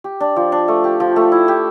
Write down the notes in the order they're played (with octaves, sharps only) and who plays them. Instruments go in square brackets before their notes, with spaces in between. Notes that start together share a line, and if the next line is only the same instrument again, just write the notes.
[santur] G4
D4
F3
D4
A3
G4
F3
A3
E4
G4